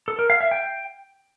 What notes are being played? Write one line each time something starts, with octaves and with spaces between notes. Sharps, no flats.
A4
A#4
F5
E5
G5